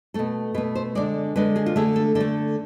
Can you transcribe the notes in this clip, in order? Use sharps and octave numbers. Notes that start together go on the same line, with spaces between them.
B2 A3 A4
B2 A3 B4
C5
D3 G#3 D5
D3 G#3 B4
G#4
F4
D3 A3 G#4
A4
D3 A4
A3